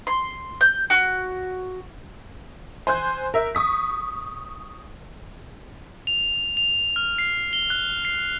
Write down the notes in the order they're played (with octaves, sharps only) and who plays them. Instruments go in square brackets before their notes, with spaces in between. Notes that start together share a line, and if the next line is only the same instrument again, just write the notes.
[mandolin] C6
G6
F#4
[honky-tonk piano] C5 G#5 C6 F#6 G6
A#4 E5
C#6 D#6 B6
[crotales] F7
F7
F6
C7
G7
F#6
C7